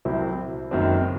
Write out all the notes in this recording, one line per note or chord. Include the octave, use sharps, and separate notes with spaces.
C2 C3 F#3 C4 E4
F#1 F#2 D#3 F#3 C4